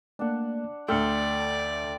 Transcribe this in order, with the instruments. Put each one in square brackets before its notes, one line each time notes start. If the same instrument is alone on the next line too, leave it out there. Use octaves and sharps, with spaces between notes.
[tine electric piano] A3 A#3 [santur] D4 F#5
[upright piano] D2 A3 [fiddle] D5 [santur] G5 C6 [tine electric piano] E6 F6 C#7